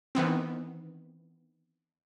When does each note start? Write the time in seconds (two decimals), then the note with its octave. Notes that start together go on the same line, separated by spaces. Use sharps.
0.15 D#3 E3 B3 C4